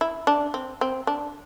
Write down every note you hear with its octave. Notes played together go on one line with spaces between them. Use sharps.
E4
D4
C4
C4
D4